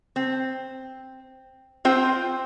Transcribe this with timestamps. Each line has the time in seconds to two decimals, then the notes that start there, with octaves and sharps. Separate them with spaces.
0.16 C4
1.85 C4 F4 C5 G5